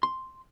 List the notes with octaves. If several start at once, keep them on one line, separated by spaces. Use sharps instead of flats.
C6